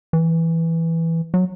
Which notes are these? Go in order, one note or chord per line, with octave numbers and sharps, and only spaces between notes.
E3
F#3